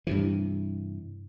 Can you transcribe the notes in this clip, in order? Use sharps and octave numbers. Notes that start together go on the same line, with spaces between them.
G2 C3 E3